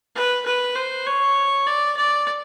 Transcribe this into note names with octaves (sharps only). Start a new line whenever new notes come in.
B4
B4
C5
C#5
D5
D5